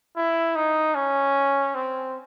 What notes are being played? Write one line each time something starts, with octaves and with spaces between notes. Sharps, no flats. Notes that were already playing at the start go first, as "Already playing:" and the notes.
E4
D#4
C#4
C4